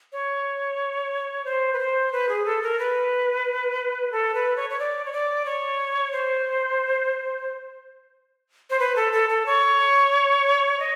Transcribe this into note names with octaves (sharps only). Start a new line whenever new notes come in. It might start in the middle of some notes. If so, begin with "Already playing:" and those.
C#5
C5
B4
C5
B4
G#4
A4
A#4
B4
A4
B4
C#5
C#5
D5
C#5
D5
C#5
C5
C5
B4
A4
A4
A4
C#5
D#5